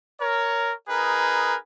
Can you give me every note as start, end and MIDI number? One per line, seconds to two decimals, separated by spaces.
0.20 0.71 70
0.20 0.71 73
0.87 1.55 63
0.87 1.55 68
0.87 1.55 70
0.87 1.55 71